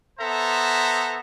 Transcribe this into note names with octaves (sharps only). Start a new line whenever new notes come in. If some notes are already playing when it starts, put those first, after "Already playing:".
B3 A4 C5 E5 A#5